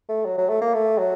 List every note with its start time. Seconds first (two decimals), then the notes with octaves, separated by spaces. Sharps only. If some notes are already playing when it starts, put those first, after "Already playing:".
0.09 A3
0.25 F#3
0.38 F#3
0.49 A3
0.61 A#3
0.74 A3
0.98 F#3